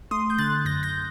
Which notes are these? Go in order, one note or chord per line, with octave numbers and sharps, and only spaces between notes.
A3 C6 D#6
G6
D3 F#6 A6
F#2 G6 A#6
G6 A#6